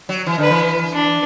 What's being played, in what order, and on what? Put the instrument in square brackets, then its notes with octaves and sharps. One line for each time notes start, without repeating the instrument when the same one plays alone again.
[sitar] F#3
E3
[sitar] D3 [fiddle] B4
[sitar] E3
[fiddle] D4